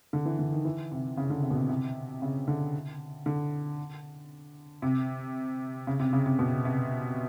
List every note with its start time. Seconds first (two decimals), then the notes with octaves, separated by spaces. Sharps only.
0.13 D3
0.26 E3
0.39 D3
0.52 D#3
0.65 E3
0.92 C3
1.17 C#3
1.30 D3
1.43 C3
1.50 B2
1.56 C3
1.69 C3
2.22 C#3
2.48 D3
3.26 D3
4.82 C3
5.87 C#3
6.00 C3
6.13 C#3
6.26 C3
6.39 B2
6.65 C3